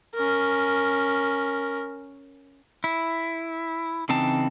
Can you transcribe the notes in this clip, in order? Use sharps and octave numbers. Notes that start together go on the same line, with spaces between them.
C#4 A#4
E4
C#3 E3 C4 D#4 A5